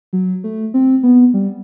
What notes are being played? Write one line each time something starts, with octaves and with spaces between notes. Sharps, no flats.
F#3
A3
C4
B3
G3